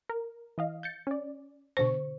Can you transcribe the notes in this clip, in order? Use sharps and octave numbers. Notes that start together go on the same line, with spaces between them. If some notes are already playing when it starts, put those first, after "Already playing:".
A#4
E3 D#5 F5
G6 A6 C#7
C#4 D5
B2 D3 C5 C#6